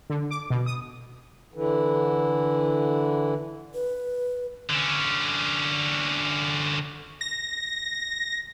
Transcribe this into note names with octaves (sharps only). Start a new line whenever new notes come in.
D3
D6
B2
D#6
D3 E3
B4
D3 C#4
A#6